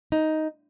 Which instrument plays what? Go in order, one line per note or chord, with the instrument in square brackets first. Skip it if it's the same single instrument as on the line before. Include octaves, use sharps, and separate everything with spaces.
[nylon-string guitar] D#4